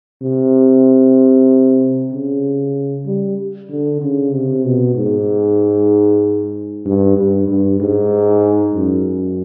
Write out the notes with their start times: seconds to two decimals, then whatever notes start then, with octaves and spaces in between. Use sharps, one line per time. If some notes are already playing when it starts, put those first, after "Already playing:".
0.22 C3
2.12 C#3
3.06 G3
3.69 D3
4.02 C#3
4.32 C3
4.64 B2
4.95 G#2
6.85 G2
7.16 G2
7.48 G2
7.80 G#2
8.75 F#2